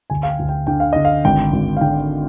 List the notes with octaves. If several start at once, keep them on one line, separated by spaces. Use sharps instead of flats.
D2 G#5
F5
G5
D2
G5
D3 G5
F5
D3 D#5
F5
G#1 G5
G#1
F5
D3 G5